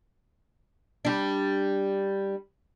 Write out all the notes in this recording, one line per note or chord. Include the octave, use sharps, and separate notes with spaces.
G3 D4